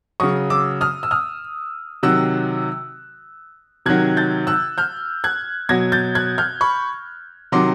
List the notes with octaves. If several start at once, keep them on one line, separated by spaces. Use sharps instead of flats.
C#3 F#3 C#6 D#6
D6 E6
D#6 F6
E6
D#6 F6
C3 D#3 F#3 E6 F#6
C3 D#3 F#3 F#6 G#6
G6 A6
E6 F#6
F6 G6
F#6 G#6
B2 F#3 G#6 A#6
G6 A6
F#6 G#6
F6 G6
B5 C#6
C3 D#3 F#3 C6 D6